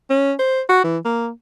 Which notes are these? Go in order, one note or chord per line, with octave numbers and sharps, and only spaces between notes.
C#4
C5
F#4
E3
A#3